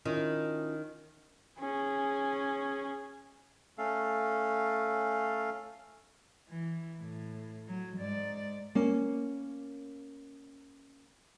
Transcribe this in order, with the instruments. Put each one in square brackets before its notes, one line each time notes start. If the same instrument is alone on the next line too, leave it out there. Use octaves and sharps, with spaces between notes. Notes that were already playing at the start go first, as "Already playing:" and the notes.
[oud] D#3 [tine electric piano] C#4 E4 F4
[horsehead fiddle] C#4 G#4
[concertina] A3 C#4 A4 F5
[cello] E3
A2
F#3
G#2 D5
[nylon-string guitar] A#3 C#4